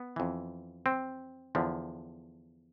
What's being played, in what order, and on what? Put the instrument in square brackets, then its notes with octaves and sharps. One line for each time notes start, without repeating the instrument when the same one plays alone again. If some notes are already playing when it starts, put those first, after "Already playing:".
Already playing: [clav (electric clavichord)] B3
F2 E3
C4
E2 D3 F3